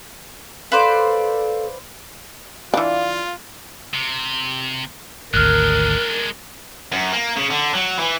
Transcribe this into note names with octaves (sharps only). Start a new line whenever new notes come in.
A4 B4 C5 D5 F5
E3 D4 F4 F5
C3
G#1 D2 G#3 D4 A#4 F6 F#6
F#2
A#3
C#3
D3
F#3
E3